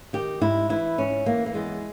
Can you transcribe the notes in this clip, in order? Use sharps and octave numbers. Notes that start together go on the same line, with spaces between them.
D#3 G4
G#2 E4
E3 E4
G#2 C#4
E3 A#3
A#3
E2 G#3